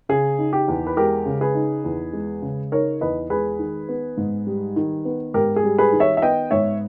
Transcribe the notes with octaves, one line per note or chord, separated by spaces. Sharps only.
C#3 G#4
D#4
G4
E2
B4
G#3 G4 A#4
C#3
G#4 B4
D#4
E2
G#3
C#3
D#4 A#4 C#5
E2 B4 D#5
G#3 G#4 B4
D#3
B3
G#2
G3
D#3
B3
G#2 G4 A#4
G#4
G3
G#4 B4
D#3
C#5 E5
E5
B3 D#5 G5
G#2 C#5 E5